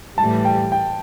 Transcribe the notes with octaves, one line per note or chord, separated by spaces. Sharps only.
A2 E3 G3 A5
G5
G5